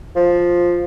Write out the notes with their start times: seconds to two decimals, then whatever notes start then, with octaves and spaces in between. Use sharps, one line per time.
0.16 F3